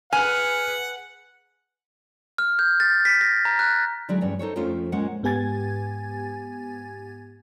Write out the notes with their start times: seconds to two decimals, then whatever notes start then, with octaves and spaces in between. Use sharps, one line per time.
0.13 G#4 B4 F#5 G#5 F6
2.38 F6
2.59 G6
2.80 A6
3.05 B6
3.21 A#6
3.45 A#5
3.59 F#6
4.09 D3 F#3 G#3 D4 E4 G#4
4.21 E2 G2 C#4
4.39 D#4 A4 C5 C#5
4.56 F2 F3 A3 C#4 F4 C5
4.92 A#2 G#3 C#4 C5 F#5
5.23 G#2 B3 G4 G#5 G#6 A6